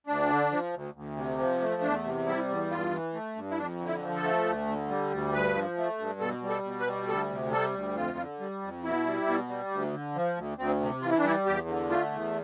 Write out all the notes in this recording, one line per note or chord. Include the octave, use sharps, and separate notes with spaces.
D2 D4
D3
F3
D2
D2
C3
F3
A3
E2 D4
C3
G3 E4
E2
G2 F4
E3
A3
G2
E4
F2 D4
D3
E4
F3
A4
A3
D2
D3
G3
D2
G2 B4
F3
A3
G2
B2 A4
G3
A4
B2
B4
G3
D2 A4
C3
G3 A4
D2
F2 F4
D3
G3
F2
B2 E4
G3
B2
G3
D2
D3
F3
D2
D2 C4
C3
E3 F4
E4
D4
G3 E4
E2 G4
D3
A3 F4
E2